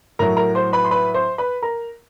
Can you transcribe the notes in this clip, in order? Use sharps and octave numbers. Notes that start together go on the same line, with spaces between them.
A2 F#3 A#4 A#5
A#4 A#5
C5 C6
B4 B5
C6
B4 B5
C5 C6
B4 B5
A#4 A#5